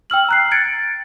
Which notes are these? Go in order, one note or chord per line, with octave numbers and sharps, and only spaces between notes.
G5 E6 F6 F#7
A#5 F#6 C7
G#6 A6 C#7 D7